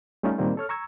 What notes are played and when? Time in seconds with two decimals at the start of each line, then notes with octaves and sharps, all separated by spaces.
0.23 G3 A3 C#4 D#4 F4
0.38 A#2 D#3 G3 A#3 C4
0.57 A4 C#5 F6
0.69 A#5 C#6 E6 G#6